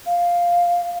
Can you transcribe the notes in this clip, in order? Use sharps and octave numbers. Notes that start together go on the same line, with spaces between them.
F5